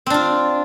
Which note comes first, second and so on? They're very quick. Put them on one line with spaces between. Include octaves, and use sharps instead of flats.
C4 D4 F4